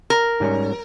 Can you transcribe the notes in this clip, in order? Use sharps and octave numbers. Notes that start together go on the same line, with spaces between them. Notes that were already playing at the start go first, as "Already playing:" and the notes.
A#4
G#2 G3 C#4